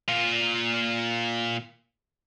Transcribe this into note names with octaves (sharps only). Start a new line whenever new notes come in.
A#2 F4